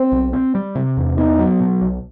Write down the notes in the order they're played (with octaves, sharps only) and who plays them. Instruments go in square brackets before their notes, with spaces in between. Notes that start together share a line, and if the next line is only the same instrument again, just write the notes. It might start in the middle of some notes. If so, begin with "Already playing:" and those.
Already playing: [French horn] C4
[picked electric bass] B1
C4
G3
C3
E2
[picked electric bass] B3 [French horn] D#4
[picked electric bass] F#3
B2
B1